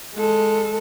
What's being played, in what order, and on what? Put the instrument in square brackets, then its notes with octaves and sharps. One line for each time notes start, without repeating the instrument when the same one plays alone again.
[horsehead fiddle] G#3 A4